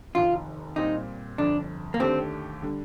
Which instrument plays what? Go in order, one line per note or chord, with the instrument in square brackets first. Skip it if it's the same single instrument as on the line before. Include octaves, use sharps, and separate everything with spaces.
[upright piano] F1 D#2 D#3 [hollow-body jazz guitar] F4
[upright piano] A#2 G3 C4 G4 [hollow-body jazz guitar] D#4
[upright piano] G1 F2 D3 [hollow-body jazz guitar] D4
[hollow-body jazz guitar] A#3
[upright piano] D#2 D3 A3 D4 G4 [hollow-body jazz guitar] C4
[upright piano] D3 G3